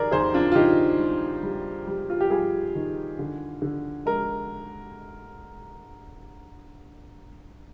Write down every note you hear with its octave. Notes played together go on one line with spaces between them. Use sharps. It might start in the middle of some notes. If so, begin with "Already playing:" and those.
Already playing: D#3 G#4 A#4 D5
D#2 G#4 C5
D4 F4
F4
D#3 D#4 G4
G3
G3
G3
F4
G4
G3 F4 G#4
D#3
D3
D3
G#3 A#4